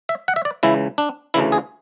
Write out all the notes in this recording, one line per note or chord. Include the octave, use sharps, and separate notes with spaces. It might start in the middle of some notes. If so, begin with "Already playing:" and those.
E5
F#5
E5
D5
C#2 C#3 E3 E4
D4
D2 C#3 E3 E4
G#4